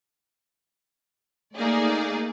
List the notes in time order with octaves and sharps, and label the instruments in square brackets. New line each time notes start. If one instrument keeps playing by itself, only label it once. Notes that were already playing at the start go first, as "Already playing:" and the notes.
[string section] A3 A#3 D#4 G#4 D5